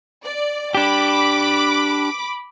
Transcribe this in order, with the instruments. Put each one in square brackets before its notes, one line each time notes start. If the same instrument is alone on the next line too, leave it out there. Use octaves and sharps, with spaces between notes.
[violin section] D5
[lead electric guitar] D4 G4 [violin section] B5 D6